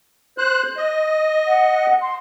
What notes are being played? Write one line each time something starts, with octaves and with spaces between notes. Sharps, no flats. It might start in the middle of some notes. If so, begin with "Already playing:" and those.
C5 F#6
D#5
F#5
C6